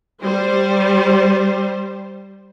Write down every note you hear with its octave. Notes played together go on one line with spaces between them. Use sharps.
G3 C5